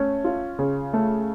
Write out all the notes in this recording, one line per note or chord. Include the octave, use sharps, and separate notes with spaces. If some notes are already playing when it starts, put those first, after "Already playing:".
Already playing: A3 C#4
F4
C#3
A3